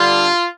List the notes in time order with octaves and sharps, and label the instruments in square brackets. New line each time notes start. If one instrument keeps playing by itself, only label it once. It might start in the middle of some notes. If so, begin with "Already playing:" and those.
Already playing: [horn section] D3 G3 F4